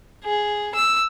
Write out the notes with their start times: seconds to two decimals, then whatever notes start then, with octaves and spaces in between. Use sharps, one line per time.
0.25 G#4
0.75 E6